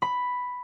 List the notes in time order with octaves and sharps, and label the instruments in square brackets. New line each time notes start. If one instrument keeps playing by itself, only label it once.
[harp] B5